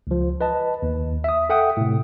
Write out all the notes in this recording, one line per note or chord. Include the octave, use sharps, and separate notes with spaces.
C#2 F3
B4 D#5 A5
D#2
E5 D#6
A4 E5 F#5 G5 D#6
A2 C3